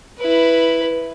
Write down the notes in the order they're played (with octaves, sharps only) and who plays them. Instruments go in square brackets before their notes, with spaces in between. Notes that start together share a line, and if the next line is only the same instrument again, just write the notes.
[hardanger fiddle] E4 B4